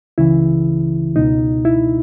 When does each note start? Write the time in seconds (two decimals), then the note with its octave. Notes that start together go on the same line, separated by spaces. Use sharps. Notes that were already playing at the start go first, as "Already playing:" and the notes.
0.18 C#2 C#3 E3 E4
1.16 C#2 B2 D#4
1.65 E4